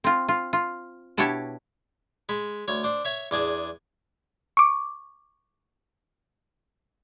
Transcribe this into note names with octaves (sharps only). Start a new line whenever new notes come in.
C4 F4
F4
F4
B2 D4 E4 G4 C#5 A5
G#3 B5
D2 C#5
D4 C5
C#5 E5
E2 D4 G#4 A5
C#6 D6